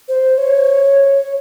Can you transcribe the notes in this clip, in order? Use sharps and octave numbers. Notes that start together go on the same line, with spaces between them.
C5
C#5